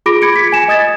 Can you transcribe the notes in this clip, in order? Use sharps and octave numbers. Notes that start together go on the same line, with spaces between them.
F4 G#4 B5 D6 A#6 D7
G#6 C#7 D7
G#6 B6
G#5 E7
D#5 D#6 G#6 A6